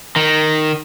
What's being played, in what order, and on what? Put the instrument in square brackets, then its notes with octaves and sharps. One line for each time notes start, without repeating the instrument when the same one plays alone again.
[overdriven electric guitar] D#3